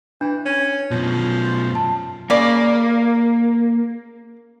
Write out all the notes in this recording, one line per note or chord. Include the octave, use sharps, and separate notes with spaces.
E3 D4
C#4
F#2 B2 F3
A5
C#3 A#3 D5